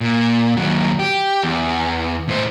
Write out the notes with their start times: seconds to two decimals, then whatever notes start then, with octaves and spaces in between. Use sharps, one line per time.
0.01 A#2
0.57 D#2 F#3
0.99 G4
1.43 E2
2.29 A2 C5